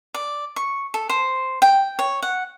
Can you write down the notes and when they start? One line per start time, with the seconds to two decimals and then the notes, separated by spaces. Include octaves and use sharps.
0.14 D5
0.56 C#6
0.94 A4
1.09 C5
1.62 G5
1.99 C#5
2.22 F#5